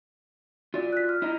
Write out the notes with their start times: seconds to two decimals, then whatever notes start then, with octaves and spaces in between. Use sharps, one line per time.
0.74 F4 F#4 D5
0.93 F#6 B6
1.09 F6
1.22 E4 D#5 A#5